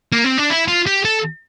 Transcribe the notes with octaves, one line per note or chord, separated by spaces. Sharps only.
A#3
C4
D4
E4
F4
G4
A4